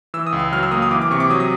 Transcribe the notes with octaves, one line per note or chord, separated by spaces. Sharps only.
E3 E6
D#6
C#2
E6
F#3 F6
E6
A#3 D#6
D#6
E3 D6
D6
C3 C#6
D6
F#3 D#6
D#6